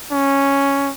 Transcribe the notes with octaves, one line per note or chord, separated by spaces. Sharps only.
C#4